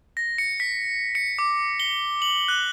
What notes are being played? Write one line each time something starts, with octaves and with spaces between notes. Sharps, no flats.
A#6
C#7
B6
C#7
D6
G7
F#7
F#6